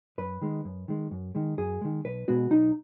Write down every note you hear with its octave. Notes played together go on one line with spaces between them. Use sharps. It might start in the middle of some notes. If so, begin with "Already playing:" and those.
F#2 B4
D#3 G#3
F#2
D#3 G#3
F#2
D#3 G#3
F#2 G#4
D#3 G#3
B1 B4
B2 G#3 B3 F#4
B1 D#4